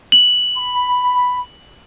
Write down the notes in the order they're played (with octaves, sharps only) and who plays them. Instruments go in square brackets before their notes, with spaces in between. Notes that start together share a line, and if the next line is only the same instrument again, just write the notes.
[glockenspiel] F#7
[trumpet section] B5